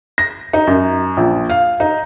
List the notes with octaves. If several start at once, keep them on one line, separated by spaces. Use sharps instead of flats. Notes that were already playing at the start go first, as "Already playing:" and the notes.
A#6
D#4
F#2
A#1
F5
D#4